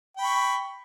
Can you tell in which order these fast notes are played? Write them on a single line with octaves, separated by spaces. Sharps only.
G5 B5 C#6